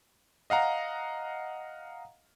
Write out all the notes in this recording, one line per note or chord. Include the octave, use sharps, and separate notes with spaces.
D#5 F5 F#5 A#5